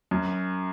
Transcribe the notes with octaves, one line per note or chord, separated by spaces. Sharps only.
F#2